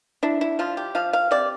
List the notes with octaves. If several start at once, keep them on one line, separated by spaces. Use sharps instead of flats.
D4 E4
E4
F3 F4
G4
F3 F5
F5
C3 D5